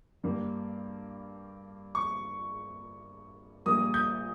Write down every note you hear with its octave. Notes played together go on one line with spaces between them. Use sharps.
G2 G3 A#3
C#6
A#1 A#2 G3 A#3 D#6
G6